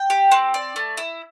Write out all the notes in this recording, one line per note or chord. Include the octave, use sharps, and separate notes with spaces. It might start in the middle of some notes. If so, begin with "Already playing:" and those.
Already playing: G5
G4
C4
D5
A3
E4